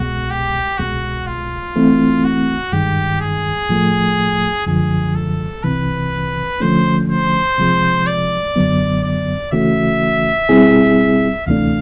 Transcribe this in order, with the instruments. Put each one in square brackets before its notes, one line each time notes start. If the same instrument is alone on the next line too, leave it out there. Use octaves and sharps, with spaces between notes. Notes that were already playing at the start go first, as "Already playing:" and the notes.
Already playing: [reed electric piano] C2 B2 G#3 [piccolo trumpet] F#4
[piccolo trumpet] G4
[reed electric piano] C2 B2 G#3 [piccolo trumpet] F#4
[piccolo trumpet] F4
[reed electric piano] E3 A3 C4 E4
[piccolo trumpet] F#4
[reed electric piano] G2 D#3 G#3 [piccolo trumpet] G4
[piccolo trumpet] G#4
[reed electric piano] A2 F3 A3
[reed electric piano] F#2 D3 F3 G#3 [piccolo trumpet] G#4
[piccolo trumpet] A4
[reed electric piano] C2 C3 E3 [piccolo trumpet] B4
[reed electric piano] D3 F3 A3 C#4 [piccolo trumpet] C5
[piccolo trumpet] C5
[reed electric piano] C3 F3 G#3
[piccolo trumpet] D5
[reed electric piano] F#2 D3 F#3 B3
[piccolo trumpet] D5
[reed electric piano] C#3 E3 A3 C#4 F#4 [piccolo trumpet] E5
[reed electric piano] B2 G3 C4 E4 G#4
[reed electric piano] D2 C3 E3 A3 D4 [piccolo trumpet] F5